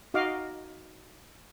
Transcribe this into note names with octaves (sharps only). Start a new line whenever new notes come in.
D#4 F#4 D#5 F5 D6